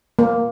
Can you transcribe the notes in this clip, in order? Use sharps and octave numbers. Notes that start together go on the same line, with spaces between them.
A#3